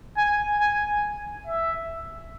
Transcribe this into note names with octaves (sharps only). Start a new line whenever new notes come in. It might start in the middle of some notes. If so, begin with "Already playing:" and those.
G#5
G#5
E5